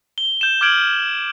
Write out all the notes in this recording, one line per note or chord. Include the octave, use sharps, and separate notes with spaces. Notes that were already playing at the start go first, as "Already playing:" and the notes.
G7
G6 E7
D6 F6 G6 G#6 D7 F#7